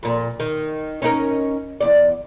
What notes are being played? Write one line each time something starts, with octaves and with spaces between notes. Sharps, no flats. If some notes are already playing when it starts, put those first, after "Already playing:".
F2 A#2
D#3
C#4 D#4 A#4
E2 C3 D5